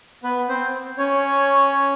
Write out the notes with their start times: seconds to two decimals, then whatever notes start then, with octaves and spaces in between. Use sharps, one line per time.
0.24 B3 B4
0.49 C4 C5
0.98 C#4 C#5